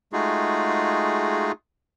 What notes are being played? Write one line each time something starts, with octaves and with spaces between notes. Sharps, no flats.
G#3 A3 D#4 F4 F#4 G#4